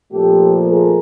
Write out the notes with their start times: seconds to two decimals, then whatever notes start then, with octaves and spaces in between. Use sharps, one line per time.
0.12 A#2 F3 A3 C4 G4 A4
0.67 G#4 A#4